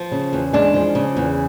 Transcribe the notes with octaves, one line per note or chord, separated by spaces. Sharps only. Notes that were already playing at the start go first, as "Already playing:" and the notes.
Already playing: F3
C#3
E2
G#3 D4
F3
C#3
E2